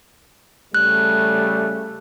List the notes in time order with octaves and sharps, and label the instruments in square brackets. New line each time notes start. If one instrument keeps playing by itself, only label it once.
[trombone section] C#3 G3 A3 [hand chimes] F#6